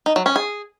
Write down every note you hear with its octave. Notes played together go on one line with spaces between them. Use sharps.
D#4
F#3
C#4
G#4